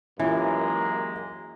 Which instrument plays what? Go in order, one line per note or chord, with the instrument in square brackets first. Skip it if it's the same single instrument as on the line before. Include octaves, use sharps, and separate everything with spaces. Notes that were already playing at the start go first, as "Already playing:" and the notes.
[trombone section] F#2 A#3 [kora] E3 [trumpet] G#3 [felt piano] C#4 F4 G4